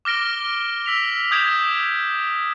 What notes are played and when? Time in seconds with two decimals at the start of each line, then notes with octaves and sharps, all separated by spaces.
0.05 D6 F6 A#6 D7 G7
0.86 E6 B6 F7
1.31 D#6 G6 G#6 A#6 D7 E7